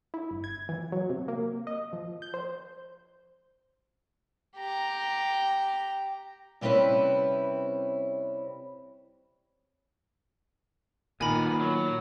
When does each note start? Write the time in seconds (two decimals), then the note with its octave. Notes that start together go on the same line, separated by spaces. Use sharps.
0.14 E4
0.31 G1
0.44 G#6
0.69 E3
0.92 F#3
1.10 C3
1.28 A#3
1.67 D#5
1.93 F3
2.22 G6
2.34 C5
4.57 G4 A#5
6.61 C3 G3 C4 C#4 E4 B4
11.21 A#2 D#3 B3 A#4 G#5 B5
11.61 F#3